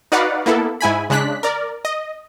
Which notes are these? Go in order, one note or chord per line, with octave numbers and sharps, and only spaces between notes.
D#4 F#4 B4 D5 F5 F#5
A#3 B3 E4 A4
G#2 E4 G#5 B5
C#3 G#3 D4 F#6 B6
A#4 D5
D#5